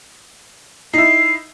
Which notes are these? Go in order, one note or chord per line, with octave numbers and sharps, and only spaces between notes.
D#4 E4 C7